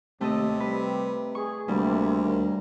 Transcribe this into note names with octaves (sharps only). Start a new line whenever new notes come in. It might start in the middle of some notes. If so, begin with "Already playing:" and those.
D#2 C3 A3 A4 D#5
G3 B4
G#4 C#6
D2 C3 G3 A#3
D#2 A#4